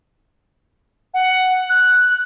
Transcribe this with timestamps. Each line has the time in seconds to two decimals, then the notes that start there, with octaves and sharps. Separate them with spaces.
1.14 F#5
1.70 F#6